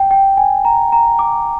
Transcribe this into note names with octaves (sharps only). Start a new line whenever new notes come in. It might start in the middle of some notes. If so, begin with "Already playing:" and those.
Already playing: G5
G5
G#5
A#5
A#5
D6